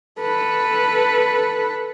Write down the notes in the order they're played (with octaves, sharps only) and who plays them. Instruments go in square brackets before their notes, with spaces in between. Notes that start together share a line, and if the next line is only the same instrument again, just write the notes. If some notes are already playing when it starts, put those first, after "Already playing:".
[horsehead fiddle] A4 B4